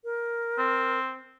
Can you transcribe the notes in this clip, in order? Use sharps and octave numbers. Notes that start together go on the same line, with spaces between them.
A#4
C4